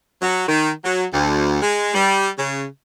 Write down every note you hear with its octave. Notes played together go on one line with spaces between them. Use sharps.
F#3
D#3
F#3
D2
G#3
G3
C#3